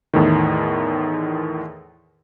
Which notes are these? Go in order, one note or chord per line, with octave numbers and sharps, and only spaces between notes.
E2 A2 D#3